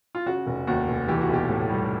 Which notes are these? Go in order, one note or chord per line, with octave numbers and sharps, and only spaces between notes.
F4
C#3 F#4
F1
D#2 F#4
F1
E3 G4
F#4
B1 G4
A2
G3